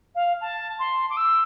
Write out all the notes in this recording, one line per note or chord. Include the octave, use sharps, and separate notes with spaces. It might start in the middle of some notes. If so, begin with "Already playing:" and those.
F5
A5
C6
D6
E6